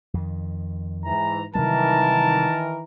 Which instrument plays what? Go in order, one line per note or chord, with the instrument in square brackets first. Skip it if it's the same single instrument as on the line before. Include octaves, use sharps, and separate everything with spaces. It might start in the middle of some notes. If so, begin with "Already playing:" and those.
[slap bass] F2 D#3
[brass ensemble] G#2 E3 A#5
[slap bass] C3 F#3 G3 [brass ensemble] D#3 E3 A#4 [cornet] A5